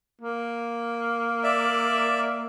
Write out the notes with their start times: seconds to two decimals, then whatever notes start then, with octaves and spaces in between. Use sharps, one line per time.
0.21 A#3
1.44 D5 E5